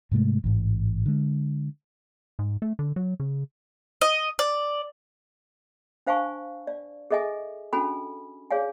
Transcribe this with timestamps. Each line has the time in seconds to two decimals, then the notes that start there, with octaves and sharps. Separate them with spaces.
0.11 G#2 C3 G#3 A3
0.44 A1 G#2
1.06 D3 G#3
2.39 G#2
2.62 A3
2.79 D3
2.96 F#3
3.20 C#3
4.01 D#5
4.39 D5
6.07 D4 C5 F5 G#5 A5 C#6
6.67 D5
7.11 G#4 A4 D#5 E5 G#5
7.73 C#4 D4 F#4 A4 G#5 B5
8.51 G#4 C#5 D5 F5 G#5